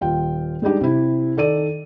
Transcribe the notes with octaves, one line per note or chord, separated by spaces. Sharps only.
D#1 F4 G5
G3 G#3 D4 D#4 G4
C3 E4
D#3 A4 D5 D#7